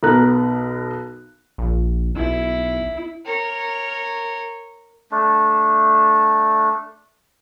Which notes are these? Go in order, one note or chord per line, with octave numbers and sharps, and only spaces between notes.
B1 B3 A#4 A#5 F#6
A#1
B1 E4
A#4 C#5
A3 D4